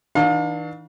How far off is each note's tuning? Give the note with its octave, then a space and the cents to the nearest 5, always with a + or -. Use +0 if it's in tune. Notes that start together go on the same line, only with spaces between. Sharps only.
E3 -40 D4 +30 F5 +40